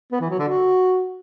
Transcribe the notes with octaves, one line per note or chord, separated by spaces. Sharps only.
B3
E3
F#3
D3
F#4